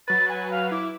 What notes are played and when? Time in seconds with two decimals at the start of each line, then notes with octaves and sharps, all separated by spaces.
0.08 F#3 B4 A6
0.29 G#5
0.51 F5
0.72 E4 D6